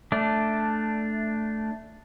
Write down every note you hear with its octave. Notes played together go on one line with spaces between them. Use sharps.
A3 D4